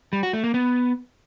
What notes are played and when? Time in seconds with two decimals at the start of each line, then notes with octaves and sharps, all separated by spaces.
0.13 G3
0.23 F#4
0.33 A3
0.44 A#3
0.54 B3